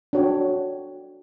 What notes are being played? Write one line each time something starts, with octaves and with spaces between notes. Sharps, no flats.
D4 F#4 C#5 G5